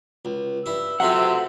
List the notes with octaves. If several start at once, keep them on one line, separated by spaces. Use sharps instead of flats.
C#2
G2 E4 E6
C3 F#3 C4 F4 A4 E5 F#5